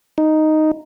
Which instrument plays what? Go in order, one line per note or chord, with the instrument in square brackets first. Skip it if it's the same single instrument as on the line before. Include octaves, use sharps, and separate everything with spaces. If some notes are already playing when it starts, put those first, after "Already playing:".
[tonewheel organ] D#4